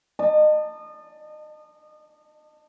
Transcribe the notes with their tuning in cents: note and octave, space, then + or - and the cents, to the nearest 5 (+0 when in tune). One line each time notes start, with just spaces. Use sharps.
D#5 -30 A5 +20